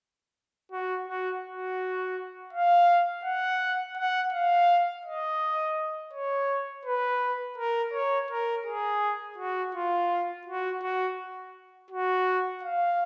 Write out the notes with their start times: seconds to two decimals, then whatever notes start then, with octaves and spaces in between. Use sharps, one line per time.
0.72 F#4
1.08 F#4
1.44 F#4
2.53 F5
3.25 F#5
3.98 F#5
4.33 F5
5.06 D#5
6.13 C#5
6.86 B4
7.58 A#4
7.94 C#5
8.31 A#4
8.66 G#4
9.38 F#4
9.75 F4
10.47 F#4
10.83 F#4
11.91 F#4
12.63 F5